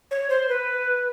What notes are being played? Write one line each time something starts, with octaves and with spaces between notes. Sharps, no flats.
C#5
C5
B4